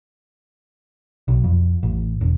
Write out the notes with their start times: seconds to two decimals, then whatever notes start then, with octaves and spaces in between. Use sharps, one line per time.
1.28 B1
1.44 F2
1.83 A1
2.21 E1